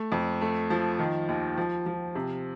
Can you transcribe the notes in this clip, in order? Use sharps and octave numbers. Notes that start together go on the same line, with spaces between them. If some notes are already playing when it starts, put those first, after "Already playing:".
Already playing: A3
F2
A3
F3
D#3
D#2
F3
F3
C3